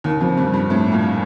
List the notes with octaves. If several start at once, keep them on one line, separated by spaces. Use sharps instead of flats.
D#2 D#3
F2 F3
G2 G3
G2 G3
A2 A3
A#2 A#3